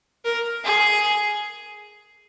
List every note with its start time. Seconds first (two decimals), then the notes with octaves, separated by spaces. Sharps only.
0.25 A#4
0.64 G#4